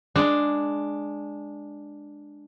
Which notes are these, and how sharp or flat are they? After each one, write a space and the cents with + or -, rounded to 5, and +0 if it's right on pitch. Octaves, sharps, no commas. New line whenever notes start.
G#3 +0 D4 +5